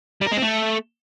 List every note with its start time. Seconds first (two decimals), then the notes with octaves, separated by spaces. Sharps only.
0.22 G3
0.27 A#4
0.32 G#3
0.37 C4
0.42 A3